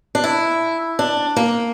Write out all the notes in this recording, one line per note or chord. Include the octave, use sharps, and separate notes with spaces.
D4
E4
D4
A#3